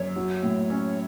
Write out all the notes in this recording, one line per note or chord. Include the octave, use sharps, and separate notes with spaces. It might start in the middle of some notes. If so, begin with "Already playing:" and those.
Already playing: F#2 C#5
F#3
A2
C#4